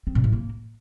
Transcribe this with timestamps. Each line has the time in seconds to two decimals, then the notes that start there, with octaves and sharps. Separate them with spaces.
0.07 C4
0.15 A#2
0.24 A2
0.33 A#3